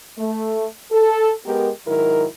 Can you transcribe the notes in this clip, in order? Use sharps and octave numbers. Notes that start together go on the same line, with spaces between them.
A3
A4
G#3 B3 G4 A#4
G#2 D#3 F#3 E4 A#4